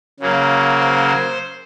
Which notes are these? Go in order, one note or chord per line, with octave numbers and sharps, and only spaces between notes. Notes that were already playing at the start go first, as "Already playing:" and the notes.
C#3 F#3 A#3
C5
C5